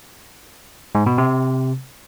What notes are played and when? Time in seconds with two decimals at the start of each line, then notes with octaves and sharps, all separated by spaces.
0.95 G#2
1.06 B2
1.18 C3